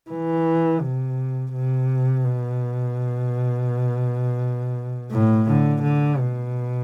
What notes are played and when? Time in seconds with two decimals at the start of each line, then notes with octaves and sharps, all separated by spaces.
0.10 E3
0.81 C3
1.53 C3
2.25 B2
5.12 A2
5.47 D3
5.83 D3
6.19 B2